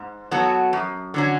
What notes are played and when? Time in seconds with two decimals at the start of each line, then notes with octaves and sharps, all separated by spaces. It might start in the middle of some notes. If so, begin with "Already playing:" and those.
Already playing: G#2
0.31 F#3 B3 F#4 A4
0.73 F#2
1.14 D3 F#3 C#4